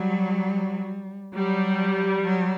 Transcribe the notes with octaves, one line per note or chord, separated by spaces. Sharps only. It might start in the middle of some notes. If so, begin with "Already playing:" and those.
Already playing: F#3 G3
F#3 G3
F#3